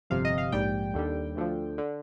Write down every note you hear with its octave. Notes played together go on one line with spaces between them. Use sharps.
G1 F2 C3 F5
D#5
F5
A#1 G#2 G3 G5
D#2 D3 G3
D2 D3 F3
D3